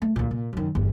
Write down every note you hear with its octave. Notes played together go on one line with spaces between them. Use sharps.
A3
D2 A#2
A#2
F#2 D#3
G1 E2